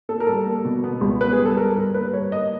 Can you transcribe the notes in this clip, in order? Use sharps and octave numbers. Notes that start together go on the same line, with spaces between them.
A#3 A4
A#4
G3 A4
A#3
B2
B3
C#2
B3 B4
G#4
G3
A4
G3 A#4
G2 A#4
A#3 B4
G3 C#5
A#3 D#5